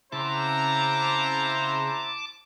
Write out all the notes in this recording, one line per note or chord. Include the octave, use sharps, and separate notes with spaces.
C#3 C4 E4 C5 F#5 A5 A#5 D6